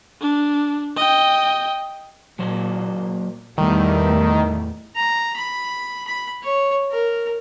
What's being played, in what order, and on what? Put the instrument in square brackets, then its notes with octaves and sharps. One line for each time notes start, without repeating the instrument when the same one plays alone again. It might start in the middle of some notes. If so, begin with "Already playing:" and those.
[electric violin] D4
D#5 G5
[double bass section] A#2 [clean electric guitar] F#3 A#3 C5
[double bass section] E2 G3 A3 [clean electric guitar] A2 [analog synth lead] D#3
[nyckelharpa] A#5
B5
B5
C#5
A#4